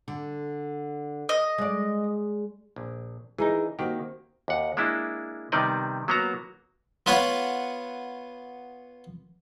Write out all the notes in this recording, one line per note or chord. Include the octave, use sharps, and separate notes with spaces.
D3
D#5
G#3 D5
A#1
E3 D#4 G#4 A#4
D#3 A#3 C4 F#4 G4
D#2 F#5
G#3 A#3 D4 E4
C3 D#3 G3 B3 D5 D#5
F#3 A#3 B3 F#4 A#5
B3 F4 B4 C#5 F#5